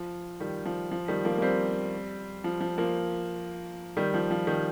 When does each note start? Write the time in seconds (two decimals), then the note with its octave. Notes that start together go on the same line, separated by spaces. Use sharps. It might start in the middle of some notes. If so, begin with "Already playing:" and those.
Already playing: F3
0.40 D#3 G3
0.65 F3
0.91 F3
1.08 D#3 G3
1.25 F3 A#3
1.38 A#3
1.42 G3 C4
2.44 F3
2.61 F3
2.78 F3 A#3
3.97 D#3 G3
4.14 F3
4.31 F3
4.47 D#3 G3